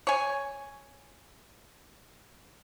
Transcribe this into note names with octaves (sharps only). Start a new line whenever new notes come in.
C#5 G#5